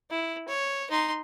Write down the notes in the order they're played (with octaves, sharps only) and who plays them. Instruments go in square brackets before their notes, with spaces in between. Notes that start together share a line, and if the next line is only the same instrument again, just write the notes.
[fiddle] E4
C#5
D#4 C6